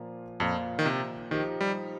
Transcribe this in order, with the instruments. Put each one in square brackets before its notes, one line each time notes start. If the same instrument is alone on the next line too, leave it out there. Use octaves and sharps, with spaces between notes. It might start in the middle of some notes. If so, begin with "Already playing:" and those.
Already playing: [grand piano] A#2 F3 A#3 F4
[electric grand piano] F2 [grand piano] A#2 F3 A#3 F4
[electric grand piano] D#3
C3
[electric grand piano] D#3 [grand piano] F3 D#4 G4
[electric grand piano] G3